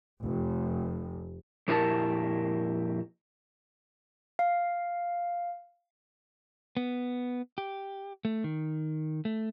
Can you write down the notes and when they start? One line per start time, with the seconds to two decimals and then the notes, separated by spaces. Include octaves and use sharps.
0.22 F1
1.68 F2 A#2 E4 G4 A#4 A5
4.39 F5
6.77 B3
7.58 G4
8.25 A3
8.44 D#3
9.25 A3